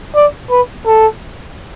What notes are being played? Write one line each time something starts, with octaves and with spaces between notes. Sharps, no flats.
D5
B4
A4